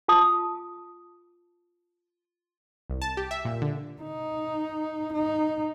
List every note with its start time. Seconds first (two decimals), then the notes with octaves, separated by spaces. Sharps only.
0.08 F4 A5 D#6
2.90 C2
3.02 A5
3.17 G4
3.31 E5
3.45 A#2
3.62 D3
4.02 D#4
5.13 D#4